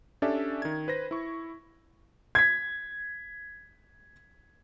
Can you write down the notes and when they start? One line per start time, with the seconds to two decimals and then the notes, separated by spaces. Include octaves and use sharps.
0.22 C#4 D4 G4 A4 D5 E5
0.62 D#3 G#6
0.88 B4 C5 A#6
1.11 E4 C#6
2.35 G#6 B6